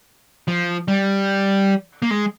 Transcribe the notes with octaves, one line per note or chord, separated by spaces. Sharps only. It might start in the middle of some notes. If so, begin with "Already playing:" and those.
F3
G3
A#3
G#3